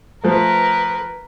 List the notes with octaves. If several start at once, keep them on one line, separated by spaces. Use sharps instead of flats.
F3 A3 A#4 B4